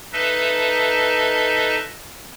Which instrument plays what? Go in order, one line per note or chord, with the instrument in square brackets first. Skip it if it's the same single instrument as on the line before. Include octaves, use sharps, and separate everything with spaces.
[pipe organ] D#4 A4 B4 D#5 E5 A5